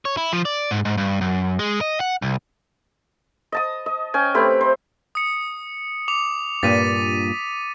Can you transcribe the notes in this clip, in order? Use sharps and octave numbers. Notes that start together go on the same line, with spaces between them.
C#5
E4
F3
D5
G#2
G#2
G2
F#2
G#3
D#5
F#5
C2
D#5 A5 D#6
D#5
C#4 G5 G#5
A3 C4 G4 B4
C5
D#6 C#7
D6 F7
G2 A#2 A6 B6 D#7